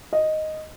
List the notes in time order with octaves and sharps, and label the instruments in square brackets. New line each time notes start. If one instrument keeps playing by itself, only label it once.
[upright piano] D#5